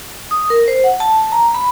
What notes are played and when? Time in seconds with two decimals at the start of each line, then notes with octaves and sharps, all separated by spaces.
0.31 D#6
0.50 A#4
0.68 C5
0.84 F#5
1.00 A5
1.32 A#5
1.54 B5